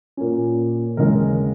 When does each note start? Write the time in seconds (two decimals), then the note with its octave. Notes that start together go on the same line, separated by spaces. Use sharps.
0.17 A#2 A#3 C#4
0.97 D#2 C#3 E3 G#3 C#4 A#4